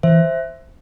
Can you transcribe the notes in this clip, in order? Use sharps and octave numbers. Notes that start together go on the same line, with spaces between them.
E3 C5 E5